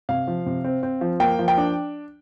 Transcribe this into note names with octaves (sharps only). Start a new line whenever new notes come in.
C3 F5
F3
C3
C4
C4
F3
A#3 G5
F3
G5
D4